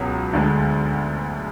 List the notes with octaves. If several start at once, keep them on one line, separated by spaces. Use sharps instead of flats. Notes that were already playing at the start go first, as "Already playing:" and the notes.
Already playing: C#2 B2 F#3 B3
D2 D3 G#3